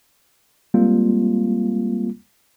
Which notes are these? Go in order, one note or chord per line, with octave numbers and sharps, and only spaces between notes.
G3 G#3 A#3 C4 F4